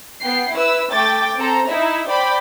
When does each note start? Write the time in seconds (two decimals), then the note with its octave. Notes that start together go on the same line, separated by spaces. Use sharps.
0.22 B3 G5 C7
0.53 E4 B4 E6
0.91 A3 G5 D6 A6
1.37 C4 A4 C5 A#5
1.67 D#4 E4 E5
2.07 C5 D5 G5 B5